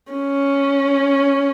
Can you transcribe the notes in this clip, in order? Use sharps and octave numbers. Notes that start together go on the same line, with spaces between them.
C#4